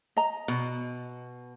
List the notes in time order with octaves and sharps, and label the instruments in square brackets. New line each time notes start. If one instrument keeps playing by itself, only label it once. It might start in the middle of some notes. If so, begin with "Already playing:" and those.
[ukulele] D#5 A#5
[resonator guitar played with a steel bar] B2